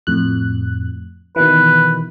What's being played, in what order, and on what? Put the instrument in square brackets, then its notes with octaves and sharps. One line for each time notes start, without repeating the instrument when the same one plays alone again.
[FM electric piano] F2 A2 F#6
[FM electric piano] B2 D#3 E3 [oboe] B4